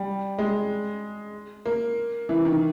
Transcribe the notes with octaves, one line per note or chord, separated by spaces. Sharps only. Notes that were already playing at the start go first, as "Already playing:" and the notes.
Already playing: G3
G#3
A#3
E3
D#3